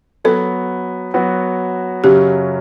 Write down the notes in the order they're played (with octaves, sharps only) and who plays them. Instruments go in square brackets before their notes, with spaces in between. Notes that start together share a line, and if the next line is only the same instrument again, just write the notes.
[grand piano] F#3 B3 F#4 [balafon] A4
[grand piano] F#3 B3 F#4
[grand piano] F#2 C#3 F#3 [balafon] G4